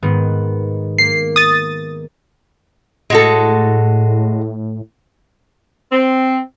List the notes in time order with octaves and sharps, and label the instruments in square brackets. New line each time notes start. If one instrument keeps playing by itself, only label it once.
[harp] G#2 D#3 B3
[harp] A#3 [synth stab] C7
[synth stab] D#6 A6
[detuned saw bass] A2 [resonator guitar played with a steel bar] G#3 F#4 A4
[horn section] C4